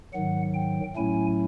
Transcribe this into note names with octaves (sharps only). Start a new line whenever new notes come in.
G#2 D#3 F#3 F#5
G5
A2 F#3 A3 C#4 E4 G#5